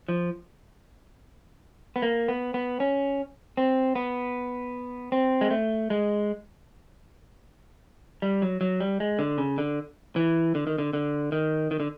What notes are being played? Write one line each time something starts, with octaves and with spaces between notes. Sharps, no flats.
F3
B3
A#3
B3
B3
C#4
C4
B3
C4
G#3
A3
G#3
G3
F#3
F#3
G3
G#3
D3
C#3
D3
E3
D3
D#3
D3
D3
D#3
D#3
D3